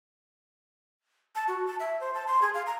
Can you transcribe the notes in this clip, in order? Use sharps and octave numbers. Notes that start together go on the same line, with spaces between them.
A5
F#4
A5
E5
C5
A5
C6
G#4
F5
A#5